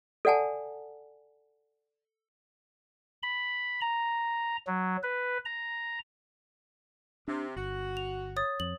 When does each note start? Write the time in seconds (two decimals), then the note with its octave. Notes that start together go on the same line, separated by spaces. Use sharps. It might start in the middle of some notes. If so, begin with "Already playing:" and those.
0.25 A4 D5 F#5 G#5 A5
3.23 B5
3.81 A#5
4.67 F#3
5.03 B4
5.45 A#5
7.28 C3 D4
7.56 G1 F#4
7.97 F7
8.36 C#5 D#6 A6
8.60 F2 F#7